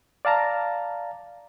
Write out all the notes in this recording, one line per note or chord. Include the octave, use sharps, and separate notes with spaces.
D5 F5 A5 A#5